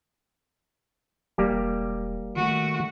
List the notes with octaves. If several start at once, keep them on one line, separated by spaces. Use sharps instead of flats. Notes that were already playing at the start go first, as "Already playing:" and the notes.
E1 G3 A#3 G4
D#3 A3 F#4